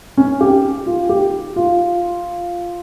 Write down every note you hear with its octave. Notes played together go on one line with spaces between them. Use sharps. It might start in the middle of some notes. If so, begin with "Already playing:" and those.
C#4
G4
F4
G4
F4